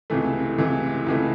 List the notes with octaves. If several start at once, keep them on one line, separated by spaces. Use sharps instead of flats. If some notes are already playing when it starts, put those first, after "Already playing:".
C#2 C3 E3 A3
C#2 C3 E3 A3
C#2 C3 E3 A3